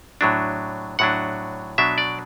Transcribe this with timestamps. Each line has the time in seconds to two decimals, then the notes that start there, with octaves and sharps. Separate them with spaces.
0.21 A2 F#3 D4
0.99 A2 F#3 D4 F#5
1.78 B2 F#3 D4 E5
1.98 D5